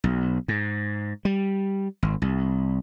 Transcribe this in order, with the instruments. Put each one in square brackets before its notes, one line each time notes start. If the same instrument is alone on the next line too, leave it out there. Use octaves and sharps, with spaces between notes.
[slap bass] B1
G#2
G3
G#1
C2